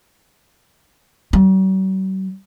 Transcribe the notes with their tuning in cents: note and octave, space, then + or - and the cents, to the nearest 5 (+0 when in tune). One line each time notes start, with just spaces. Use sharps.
F#3 +45